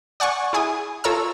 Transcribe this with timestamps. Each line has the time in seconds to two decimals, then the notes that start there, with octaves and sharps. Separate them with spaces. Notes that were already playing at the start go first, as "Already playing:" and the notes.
0.20 D5 F#5 G#5 C#6
0.53 E4 G#4 G#5 D#6
1.04 F4 A4 C#5 A#5 E6